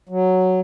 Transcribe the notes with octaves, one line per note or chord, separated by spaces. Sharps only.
F#3